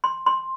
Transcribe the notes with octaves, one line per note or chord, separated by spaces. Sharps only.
C6
C6